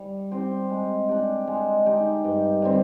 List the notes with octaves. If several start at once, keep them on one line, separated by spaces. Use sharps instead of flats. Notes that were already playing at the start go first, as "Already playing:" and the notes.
Already playing: G3
C4 G4 C5
G#3
D4 G4
G#3
D#4 G4
G2
D3 G3 C4